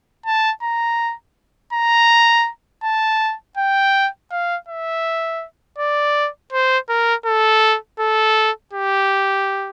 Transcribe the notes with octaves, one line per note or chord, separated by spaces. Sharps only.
A5
A#5
A#5
A5
G5
F5
E5
D5
C5
A#4
A4
A4
G4